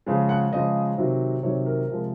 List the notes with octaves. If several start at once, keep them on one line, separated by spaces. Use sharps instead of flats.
C#3 F3 G#3
F#5
C#3 F3 G#3 D#5
C3 D#3 F#3
C3 D#3 F#3 C#5
A#4
C3 F3 G#3